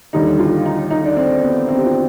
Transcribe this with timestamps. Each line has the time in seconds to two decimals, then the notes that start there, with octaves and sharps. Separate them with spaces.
0.13 D#2 D3 G3 D#4
0.39 F4
0.65 D#4
0.90 D#4
1.05 D4
1.17 C4
1.42 B3
1.68 C4
1.77 G4
1.86 F4